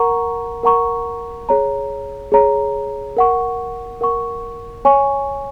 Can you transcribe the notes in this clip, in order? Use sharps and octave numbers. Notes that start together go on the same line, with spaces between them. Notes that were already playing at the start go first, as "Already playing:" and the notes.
Already playing: A#4 F#5 A#5 C#6
A#4 F#5 A#5 C#6
G#4 C#5 A#5
G#4 C#5 A#5
A#4 F#5 C#6
A#4 F#5 C#6
C#5 G#5 C#6